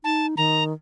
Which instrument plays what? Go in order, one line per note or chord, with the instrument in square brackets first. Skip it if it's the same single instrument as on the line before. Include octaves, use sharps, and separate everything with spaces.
[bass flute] D#4 [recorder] A5
[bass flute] D#3 [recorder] A#5